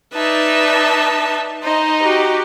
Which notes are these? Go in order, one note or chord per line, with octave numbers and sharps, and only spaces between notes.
D#4 B4 D5 E5 A5
D#4 C5 D#5
F#4 G4